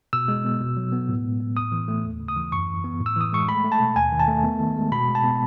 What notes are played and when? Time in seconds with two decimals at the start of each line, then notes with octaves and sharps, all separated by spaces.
0.13 B2 E6
0.28 G#3
0.45 B3
0.61 B2
0.77 F#3
0.92 B3
1.08 A2
1.24 G#3
1.40 B3
1.56 A2 D#6
1.72 E3
1.88 A3
2.04 D#2
2.20 C#3
2.28 D#6
2.36 E3
2.52 F#2 C#6
2.68 E3
2.84 B3
3.01 A2
3.06 E6
3.16 E3 D#6
3.33 G#3 C#6
3.49 A3 B5
3.64 A3
3.72 A5
3.80 B2
3.95 D#2 G#5
4.12 D#3
4.20 A5
4.28 A3
4.44 B3
4.60 D#3
4.76 G#3
4.92 B2 B5
5.08 G#3
5.15 A5
5.24 B3